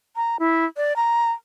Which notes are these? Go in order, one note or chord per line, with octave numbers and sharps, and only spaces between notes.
A#5
E4
D5
A#5